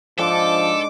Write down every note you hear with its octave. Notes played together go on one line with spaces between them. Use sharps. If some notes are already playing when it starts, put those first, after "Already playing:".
G#2 F3 D4 A4 C5 D6